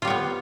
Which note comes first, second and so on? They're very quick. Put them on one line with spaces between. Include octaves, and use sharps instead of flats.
F4 G3 C#5 B3